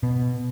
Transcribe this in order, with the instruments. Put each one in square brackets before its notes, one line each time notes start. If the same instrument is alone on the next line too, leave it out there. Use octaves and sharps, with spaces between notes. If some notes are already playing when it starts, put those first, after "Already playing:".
[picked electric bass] B2